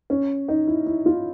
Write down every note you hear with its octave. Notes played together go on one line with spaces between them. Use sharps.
C#4
D#4
E4
E4
F4